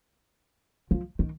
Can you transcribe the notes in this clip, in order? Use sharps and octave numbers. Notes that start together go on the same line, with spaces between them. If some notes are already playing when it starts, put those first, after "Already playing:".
F3
D#3